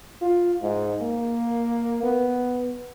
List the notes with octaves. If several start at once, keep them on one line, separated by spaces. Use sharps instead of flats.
F4
G#2
A#3
B3